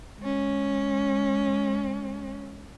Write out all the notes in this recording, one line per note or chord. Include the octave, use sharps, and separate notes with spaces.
G#3 C#4